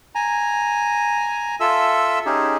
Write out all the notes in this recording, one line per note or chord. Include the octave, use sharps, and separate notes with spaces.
G#5 A#5
F4 A4 E5 E6
C#4 D#4 G4 G#4